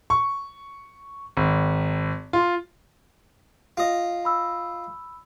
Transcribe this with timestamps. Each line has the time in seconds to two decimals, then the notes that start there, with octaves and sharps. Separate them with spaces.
0.10 C#6
1.37 G#1
2.33 F4
3.77 F4 D#5
4.25 B5 E6